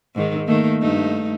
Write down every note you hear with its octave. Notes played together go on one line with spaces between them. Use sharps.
G#2 D#3
D#3 A3 A#3
G2 A3 D#4